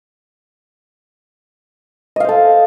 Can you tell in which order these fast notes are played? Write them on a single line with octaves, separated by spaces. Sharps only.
D#5 F5 C5 A4